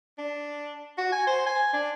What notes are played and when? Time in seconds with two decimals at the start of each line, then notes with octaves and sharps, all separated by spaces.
0.18 D4
0.98 F#4
1.12 G#5
1.27 C5
1.46 G#5
1.73 D4